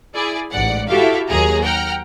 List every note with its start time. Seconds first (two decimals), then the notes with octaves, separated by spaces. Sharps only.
0.14 E4 G#4 D5
0.51 A1 G#2 D5 F#5
0.89 E4 F#4 G4 A4 E5 F5
1.28 D#2 F#3 G#4 A#5
1.62 F#5 G5 A#5 F6